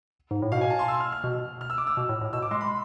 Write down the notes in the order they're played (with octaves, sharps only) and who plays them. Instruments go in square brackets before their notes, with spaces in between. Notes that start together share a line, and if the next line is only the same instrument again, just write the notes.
[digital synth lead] G#2
A2
[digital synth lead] B2 [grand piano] F5
[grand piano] G#5
A5
C6
E6
F6
F6
[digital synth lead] B2
[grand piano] F6
E6
D6
E6
[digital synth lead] B2
A2
A2
[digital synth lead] B2 [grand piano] E6
[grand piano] D6
[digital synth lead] G#3 [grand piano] C6
[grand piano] B5